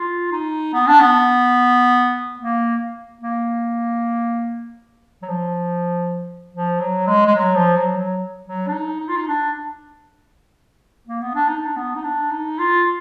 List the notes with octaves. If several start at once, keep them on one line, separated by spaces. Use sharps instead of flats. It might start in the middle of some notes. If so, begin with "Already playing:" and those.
Already playing: F4
D#4
B3
D4
B3
A#3
A#3
F#3
F3
F3
F#3
G#3
G#3
F#3
F3
F#3
F#3
F#3
D4
D#4
D#4
F4
D#4
D4
A#3
B3
D4
D#4
D4
B3
D#4
D4
D#4
F4